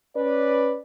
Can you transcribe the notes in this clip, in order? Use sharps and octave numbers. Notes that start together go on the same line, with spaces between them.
C#4 B4 D5